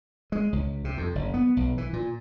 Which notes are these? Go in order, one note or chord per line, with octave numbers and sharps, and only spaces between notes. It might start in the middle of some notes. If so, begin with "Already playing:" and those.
G#3
C#2
C3
F2
F#1
B3
B1
E3
A#2